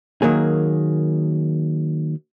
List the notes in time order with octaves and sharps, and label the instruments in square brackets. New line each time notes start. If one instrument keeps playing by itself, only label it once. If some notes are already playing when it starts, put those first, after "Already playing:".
[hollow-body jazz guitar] D#3 F#3 A#3 G#4